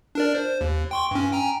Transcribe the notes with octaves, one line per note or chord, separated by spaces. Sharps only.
D4 A#4 D5
C5
D#2
G5 C6 C#6
G2 C#4
G5 G#5 A#5